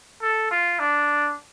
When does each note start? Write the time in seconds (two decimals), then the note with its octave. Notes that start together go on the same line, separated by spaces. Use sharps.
0.22 A4
0.51 F4
0.80 D4